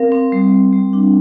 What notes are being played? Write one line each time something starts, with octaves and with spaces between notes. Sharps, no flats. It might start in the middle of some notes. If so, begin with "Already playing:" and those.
Already playing: C4 A#4 F5
C4
G3
G3
G3
D4